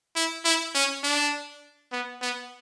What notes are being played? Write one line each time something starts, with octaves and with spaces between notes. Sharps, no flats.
E4
E4
C#4
D4
B3
B3